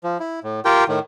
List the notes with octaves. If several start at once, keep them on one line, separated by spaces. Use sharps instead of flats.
F3
E4
A2
F4 G4 A#4 G5
A2 D#3